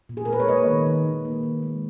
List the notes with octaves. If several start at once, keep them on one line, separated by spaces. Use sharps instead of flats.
A#2
G#4
A#4
G#3 B4
C#5
A#3 D#5
D#3
D#3
D#3
A#3
D#3
G#3